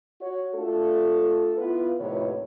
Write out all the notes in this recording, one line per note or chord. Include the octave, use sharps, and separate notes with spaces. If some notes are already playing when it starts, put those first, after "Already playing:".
F#4 C#5
A3 D4 F4 A4
B3 E4 F4 B4
D#2 A2 C3 F3 B4 C#5